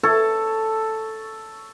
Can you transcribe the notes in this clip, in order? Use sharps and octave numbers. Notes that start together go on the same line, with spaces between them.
A4 C#5